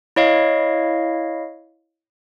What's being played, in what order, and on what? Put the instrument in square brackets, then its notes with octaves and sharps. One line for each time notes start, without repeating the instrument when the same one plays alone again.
[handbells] E4 C#5 D#5 F5